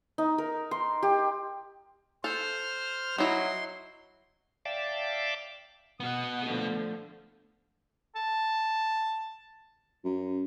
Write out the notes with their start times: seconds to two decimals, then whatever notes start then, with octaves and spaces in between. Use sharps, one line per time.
0.18 D#4
0.38 A#4
0.71 C6
1.03 G4
2.24 A4 C5 F6
3.18 F#3 D#4 E4 C6
4.65 D5 E5 F5 G5 A5 D6
6.00 B3 F#4 F#5 D#6
6.45 D3 F3 A3
8.15 A5
10.04 F#2